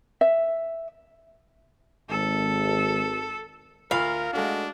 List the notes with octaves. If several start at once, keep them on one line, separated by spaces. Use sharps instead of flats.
E5
G#1 A4
D2 F4 A#4 F5 B5
G#3 A3 D4 F#4